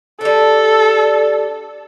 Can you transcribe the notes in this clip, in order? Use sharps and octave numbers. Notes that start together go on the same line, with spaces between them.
G3 D4 A4